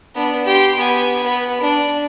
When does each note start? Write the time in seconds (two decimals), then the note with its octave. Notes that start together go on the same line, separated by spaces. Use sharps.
0.15 B3 D4
0.45 G4 C6
0.79 B3 G#5
1.23 B3 B4
1.61 D4